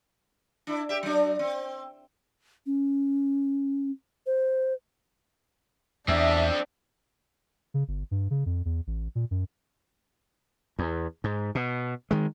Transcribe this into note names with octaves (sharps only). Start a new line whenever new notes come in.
D4 E4
G4 E5
F#3 D4
C4
C#4
C5
E2 C4 D4 A4 E5
C#3
G1
G2
C#3
F2
E2
A1
A#2
F#2
E2
G#2
B2
D#3 G#3